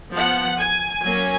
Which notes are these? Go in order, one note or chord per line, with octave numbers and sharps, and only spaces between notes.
F3 B3 F#5
G#5
F#3 A#3 C#4 G#5